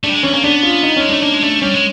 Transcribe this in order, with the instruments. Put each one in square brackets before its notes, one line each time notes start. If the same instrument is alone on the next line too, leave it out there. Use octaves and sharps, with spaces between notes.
[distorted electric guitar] A3 [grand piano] D4
[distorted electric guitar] G3
G#3
[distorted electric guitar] E3 [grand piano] C#4
[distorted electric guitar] A#3 [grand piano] C#4
[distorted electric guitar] B3 [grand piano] D4
[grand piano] F4
D#4
[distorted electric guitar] G#3 [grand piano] C#4
[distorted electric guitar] A3 [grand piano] D4
[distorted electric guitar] A#3 [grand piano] D4
[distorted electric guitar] G#3
[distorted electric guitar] A3 [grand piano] D4
[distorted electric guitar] G3 [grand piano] C#4
[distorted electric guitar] G#3